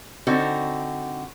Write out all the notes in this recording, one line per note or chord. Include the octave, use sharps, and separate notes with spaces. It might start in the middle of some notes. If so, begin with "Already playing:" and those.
D3 C4 D#4 F#4